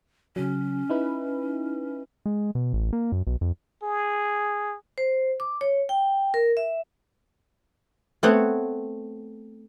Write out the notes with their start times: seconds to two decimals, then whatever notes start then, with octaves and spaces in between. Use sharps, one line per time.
0.36 C#3 F#3 C#4
0.89 D#4 E4 B4
2.26 G#3
2.55 B2
2.73 A1
2.93 A#3
3.12 F#2
3.27 B1
3.41 F2
3.83 G#4
4.98 C5
5.40 D6
5.61 C#5
5.89 G5
6.34 A#4
6.57 E5
8.23 A3 B3 C4 C#5 F#5